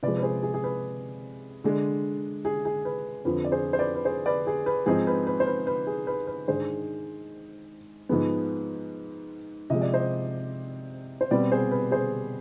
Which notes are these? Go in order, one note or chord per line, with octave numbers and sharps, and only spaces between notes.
C3 F3 G#3 B4 D5
B4
G#4 C5
G#4
G#4
B4
D3 G#3 D4
G#4
G#4
B4
F2 D3 F3 C4 B4
D5
G#4 C5
C5
B4 D5
B4
G#4 C5
B4 D5
G#4
B4
G#2 F3 C4 D#4 G#4
B4
B4
C5
B4
B4
G#4
B4
B4
G#2 D#3 G#3 D4 G#4 C5
G#2 F3 G#3 B3
C3 F3 G#3 D#5
D5
C5 D#5
C5
B2 G3 C4 B4 D5
G#4 C5
B4
G#4 C5